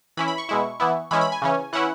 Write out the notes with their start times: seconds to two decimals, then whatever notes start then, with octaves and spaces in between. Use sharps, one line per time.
0.17 E3 C#4 E4 B5
0.28 B5
0.38 C#6
0.49 B2 G#3 E4
0.80 E3 B3 E4
1.11 E3 G#3 C#4 E4 B5
1.21 B5
1.32 G#5
1.42 C#3 E3 C#4
1.73 E3 C#4 E4 F#5